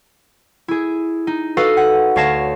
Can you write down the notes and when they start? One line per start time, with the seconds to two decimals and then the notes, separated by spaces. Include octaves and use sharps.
0.68 E4 G#4
1.27 D#4
1.57 F#4 A4 B4 D#5 F5
1.77 F#5
2.16 D2 C#5 F5 A5 A#6 E7